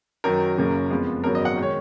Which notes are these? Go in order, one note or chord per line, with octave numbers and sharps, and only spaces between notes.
F#2 D#3 F#3 A#4
F#1 F#2 C#3 F#3 A#3
F2 F3 G#3 B3
G#1 F#2 C#3 F#3 B3 A#4
D#5
F#5
D#3 G#3
C#5